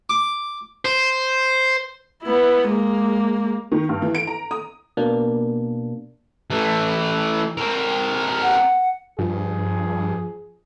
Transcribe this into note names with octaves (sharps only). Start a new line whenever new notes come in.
D6
C5
B3 E4
G#3 A#3
D#3
G2
E3
D7
A#5
D#6
B2 A#3 D4
E3 A3
C4 A#4
F#5
G2 F3 G#4